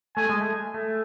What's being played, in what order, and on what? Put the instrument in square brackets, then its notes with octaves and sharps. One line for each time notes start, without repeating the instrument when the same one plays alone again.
[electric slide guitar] A3 [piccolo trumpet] G#5
[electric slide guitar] G#3
A3
A3